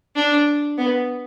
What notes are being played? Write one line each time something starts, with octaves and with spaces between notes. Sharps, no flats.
D4
B3